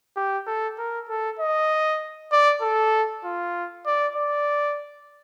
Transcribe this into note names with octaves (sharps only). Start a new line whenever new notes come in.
G4
A4
A#4
A4
D#5
D5
A4
F4
D5
D5